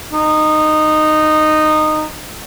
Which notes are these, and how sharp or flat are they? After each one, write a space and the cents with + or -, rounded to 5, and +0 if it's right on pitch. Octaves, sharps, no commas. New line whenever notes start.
D#4 -15